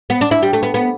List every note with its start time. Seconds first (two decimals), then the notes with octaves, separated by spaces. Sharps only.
0.10 B3
0.21 D4
0.31 E4
0.43 G3
0.53 A3
0.63 B3
0.74 B3